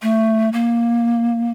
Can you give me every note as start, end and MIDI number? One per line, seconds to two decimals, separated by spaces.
0.02 0.49 57
0.53 1.51 58